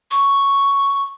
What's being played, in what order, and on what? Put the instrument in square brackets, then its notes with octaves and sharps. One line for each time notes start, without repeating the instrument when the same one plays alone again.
[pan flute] C#6